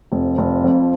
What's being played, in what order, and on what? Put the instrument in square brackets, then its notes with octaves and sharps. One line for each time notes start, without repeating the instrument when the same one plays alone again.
[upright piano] F1 [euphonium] F3
[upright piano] F1
F2